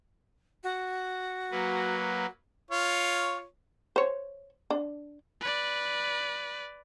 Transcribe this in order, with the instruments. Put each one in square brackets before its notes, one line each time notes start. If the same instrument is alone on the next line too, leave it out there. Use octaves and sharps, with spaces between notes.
[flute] F#4
[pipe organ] F#3 A#3 B4
[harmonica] F4 C#5
[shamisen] C5 C#5
D4
[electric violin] B4 D5